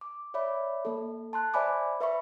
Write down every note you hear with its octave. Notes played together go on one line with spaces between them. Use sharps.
D6
C#5 D5 E5 B5 D6
A#3 A4
A5 C6 F#6
C5 D5 E5 G#5 B5 D6
B4 E5 B5 C#6